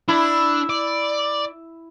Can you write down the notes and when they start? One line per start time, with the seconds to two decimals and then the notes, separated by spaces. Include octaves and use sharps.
0.08 D4 E4
0.69 D5